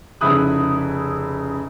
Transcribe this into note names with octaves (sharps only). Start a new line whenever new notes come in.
F1 C#3 E4 B5 D#6 F#6